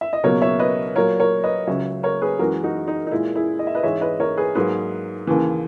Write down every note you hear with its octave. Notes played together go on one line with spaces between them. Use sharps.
E5
D#5
C#2 B2 F#3 A#3 A#4 C#5
C#5 E5
B4 D#5
A#2 F#3 A#3 A#4 C#5
A#4 C#5
B4 D#5
C#2 C#3 F#3 C#5 E5
A#4 C#5
G#4 B4
F#2 E3 G#3 F#4 A#4
D#4 F#4
D#4
D#4
A#2 G#3 E4
E4 G#4
D#5
E5
B4 D#5
G#2 E3 G#3 C#5 E5
B4 D#5
A#4 C#5
G#4 B4
G#2 F#3 A#3 G#4 B4
D#2 C#3 E3